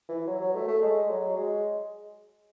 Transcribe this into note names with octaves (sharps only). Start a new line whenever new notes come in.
E3
F#3
F#3
A3
A3
G#3
F#3
G#3